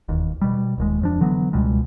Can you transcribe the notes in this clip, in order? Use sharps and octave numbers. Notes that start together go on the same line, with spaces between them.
E1 D#2
B2 G3
D#1 D#2 G#3
F2 F3 D4
D3 E3 F#3 B3
C#2 B2 G3 G#3